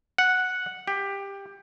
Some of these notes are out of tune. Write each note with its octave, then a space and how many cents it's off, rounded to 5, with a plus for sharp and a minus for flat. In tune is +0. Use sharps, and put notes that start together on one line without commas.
F#5 -5
G4 +15